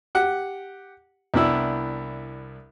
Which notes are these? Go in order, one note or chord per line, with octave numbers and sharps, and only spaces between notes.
G4 F#5
C2 B3 D4 E4 B5 E6